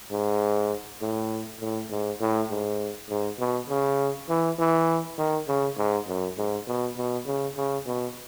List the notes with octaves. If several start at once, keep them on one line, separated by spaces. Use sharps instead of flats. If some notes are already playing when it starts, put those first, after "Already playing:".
G#2
A2
A2
G#2
A2
G#2
G#2
B2
C#3
E3
E3
D#3
C#3
G#2
F#2
G#2
B2
B2
C#3
C#3
B2